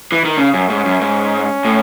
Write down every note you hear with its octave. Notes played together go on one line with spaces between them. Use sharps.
E3
D#3
C#3 C#4
F#2
G#2
F#2
G#2
A2